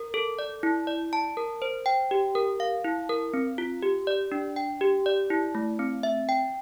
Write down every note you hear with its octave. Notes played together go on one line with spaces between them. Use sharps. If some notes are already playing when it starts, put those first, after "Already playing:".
Already playing: A#4
A4
D5
E4
D5
A5
A#4
C5
G5
G4
A#4
F5
E4
A#4
C4
F4
G4
D5
D4
G5
G4
D5
E4
A3
C4
E5
G5